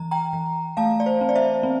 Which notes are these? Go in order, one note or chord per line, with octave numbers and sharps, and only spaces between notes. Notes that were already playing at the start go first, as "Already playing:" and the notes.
Already playing: E3 A#5
G5 A#5
E3
A3 F5 A5
D5
C5
C4
D5
C5 E5
C4